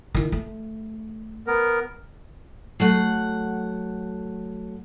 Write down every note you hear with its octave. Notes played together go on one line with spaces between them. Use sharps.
D#3 E4
A3
B3 A#4
F#3 A3 F#5